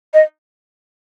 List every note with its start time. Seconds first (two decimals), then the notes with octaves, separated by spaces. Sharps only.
0.14 D#5